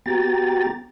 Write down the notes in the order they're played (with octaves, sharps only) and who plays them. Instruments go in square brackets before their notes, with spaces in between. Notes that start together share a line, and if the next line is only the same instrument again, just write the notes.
[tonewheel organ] B3 F#4 G4 G5 A#5 A6